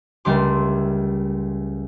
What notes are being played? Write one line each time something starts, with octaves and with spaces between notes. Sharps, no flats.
C#2 G3 A3 A#4 C6 D6